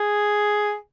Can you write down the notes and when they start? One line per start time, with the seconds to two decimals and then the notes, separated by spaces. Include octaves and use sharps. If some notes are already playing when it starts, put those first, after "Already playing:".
Already playing: G#4